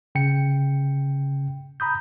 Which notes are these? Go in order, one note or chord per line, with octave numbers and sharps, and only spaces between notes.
C#3 G5 C#7
A#5 B5 D#6 G6